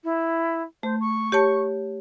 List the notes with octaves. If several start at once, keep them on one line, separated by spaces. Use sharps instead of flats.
E4
A3 C5
C#6
G4 C#5 A5